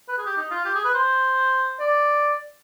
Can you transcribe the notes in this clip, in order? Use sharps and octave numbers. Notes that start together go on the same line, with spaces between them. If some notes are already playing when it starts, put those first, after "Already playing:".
B4
G#4
G4
D#4
F4
G4
G#4
B4
C5
D5